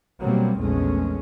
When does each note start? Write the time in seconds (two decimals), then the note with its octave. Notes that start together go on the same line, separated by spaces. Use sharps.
0.20 B2 F#3 G3 A#3 C4
0.59 A#1 E2 G#3 A3 C#4